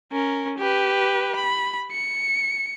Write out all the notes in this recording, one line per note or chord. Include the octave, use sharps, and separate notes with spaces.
C#4 A#4
G4 B4
B5
C#7